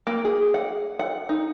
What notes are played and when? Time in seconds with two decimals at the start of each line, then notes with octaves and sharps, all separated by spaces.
0.07 A#3
0.25 G#4
0.54 F#5
0.99 F#5
1.29 D#4